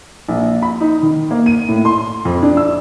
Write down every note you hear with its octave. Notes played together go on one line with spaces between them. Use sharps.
A#1
B5
D#4
D#3
A#3
D#7
A2
C6
F2
D4
E6